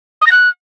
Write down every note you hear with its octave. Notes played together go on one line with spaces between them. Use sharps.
D#6
A#6
F#6